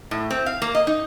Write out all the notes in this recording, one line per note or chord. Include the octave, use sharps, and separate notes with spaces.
A2
C4
F5
A#3
D#5
D#4